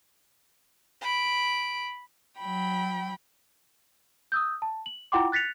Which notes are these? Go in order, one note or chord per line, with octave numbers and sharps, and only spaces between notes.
B5 D7
F#3 G5 B5
D#6 E6 G6
A5
F#7
E4 F4 F#5 G5 C6 D6
F#6 A6 B6 C#7 F7